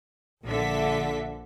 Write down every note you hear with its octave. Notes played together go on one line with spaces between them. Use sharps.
A#1 D3 A4 E5 B6